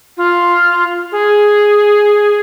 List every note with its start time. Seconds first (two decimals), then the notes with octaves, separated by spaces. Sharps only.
0.17 F4
1.12 G#4